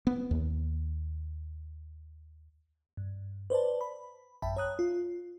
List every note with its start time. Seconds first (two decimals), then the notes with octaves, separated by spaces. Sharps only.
0.07 B3
0.31 D#2
2.97 G2
3.50 B4 C5 D5 A5
3.81 B5
4.42 A1 F#2 E5 G5 A5 B5
4.57 C#5 A#5 D#6 F#6
4.79 F4